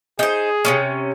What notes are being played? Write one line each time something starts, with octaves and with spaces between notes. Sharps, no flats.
D#4 G#4 C5
C3 B3 C#4